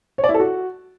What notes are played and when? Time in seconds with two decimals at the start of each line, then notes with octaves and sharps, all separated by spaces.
0.18 C#5
0.24 D5
0.29 E4
0.34 A4
0.40 F#4